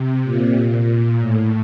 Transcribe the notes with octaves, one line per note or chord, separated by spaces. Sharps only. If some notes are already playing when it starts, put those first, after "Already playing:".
Already playing: C3
A#2
A#2
A#2
A2